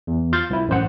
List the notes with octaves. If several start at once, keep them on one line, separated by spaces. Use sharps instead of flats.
E2
F4 F5 G6 A6
C2 E4
A1 F#2 C5 F#5